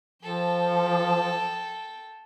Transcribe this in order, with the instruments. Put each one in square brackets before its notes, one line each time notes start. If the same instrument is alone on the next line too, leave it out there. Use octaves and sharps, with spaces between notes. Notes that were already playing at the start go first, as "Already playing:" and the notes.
[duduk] F3 [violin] A4 G5